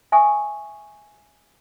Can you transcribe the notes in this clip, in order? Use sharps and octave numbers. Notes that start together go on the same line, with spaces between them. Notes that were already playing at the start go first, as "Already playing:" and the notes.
E5 G5 G#5 C#6 D#6